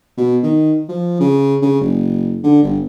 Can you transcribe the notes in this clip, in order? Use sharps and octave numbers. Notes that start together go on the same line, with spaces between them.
B2
D#3
F3
C#3
C#3
F#1
D3
G1